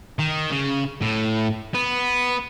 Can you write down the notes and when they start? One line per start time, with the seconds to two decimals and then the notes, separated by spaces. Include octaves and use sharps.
0.19 D#3
0.51 C#3
1.01 A2
1.74 B3